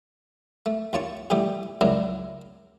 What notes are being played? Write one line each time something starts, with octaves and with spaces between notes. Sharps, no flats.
A3
D#2 F4 C#5 A5 C#6
B2 E3 G3 A3 B3 G4
C#2 C#3 F#3 D4 E4 A#4